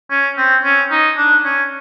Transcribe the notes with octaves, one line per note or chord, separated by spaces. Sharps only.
C#4
C4
C#4
D#4
D4
C#4